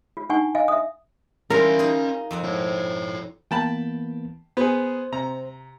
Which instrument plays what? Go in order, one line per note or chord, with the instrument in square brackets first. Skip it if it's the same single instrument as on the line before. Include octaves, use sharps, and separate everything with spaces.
[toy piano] F4
D4 D#4 F#5 G#5 C#6
D#5 F5 G#5
E5 D#6
[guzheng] E3 G3 F4 [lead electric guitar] C#4 C6 [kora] A#4
[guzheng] D#4 G#4
F2 C4 F#5
[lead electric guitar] E4 C#5
[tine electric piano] E3 A#3 B3 [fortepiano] G5 A5 B5
[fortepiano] B3 G#4 [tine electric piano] C5
[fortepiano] C3 A#5